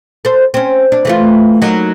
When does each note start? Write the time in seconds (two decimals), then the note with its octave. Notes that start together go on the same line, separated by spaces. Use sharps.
0.25 A4 C5
0.54 C4 C#4
0.92 D4
1.05 E3 A3 F4
1.62 F#3 A#3 D#4